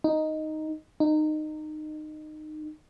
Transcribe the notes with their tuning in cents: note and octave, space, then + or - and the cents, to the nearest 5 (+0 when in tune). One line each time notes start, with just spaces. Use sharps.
D#4 +0
D#4 -20